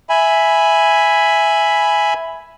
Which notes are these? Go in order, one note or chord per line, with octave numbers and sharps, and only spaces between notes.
E5 G#5 B5